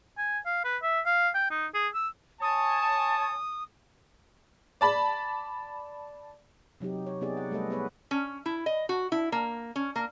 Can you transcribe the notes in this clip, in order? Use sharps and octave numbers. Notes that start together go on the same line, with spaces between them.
G#5
F5
B4
E5
F5
G5
D#4
G#4
E6
C#5 G#5 A5 D#6
D5 A5 B5
C3 F#3 D#4 G4
C#5
C3 B3 D#4 G4 G#4 D5
F#5
G3 A3 A4 B4 D#5
B3 G#4 B4 C#5
C#4
E4
D#5
F#4
E4
A#3
C#4
A#3